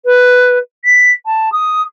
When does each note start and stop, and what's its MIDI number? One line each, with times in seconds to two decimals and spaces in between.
0.05 0.58 71
0.85 1.11 95
1.26 1.52 81
1.52 1.82 87